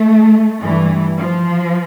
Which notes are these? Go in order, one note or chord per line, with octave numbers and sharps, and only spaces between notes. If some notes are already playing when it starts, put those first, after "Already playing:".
Already playing: A3
G2 E3
F3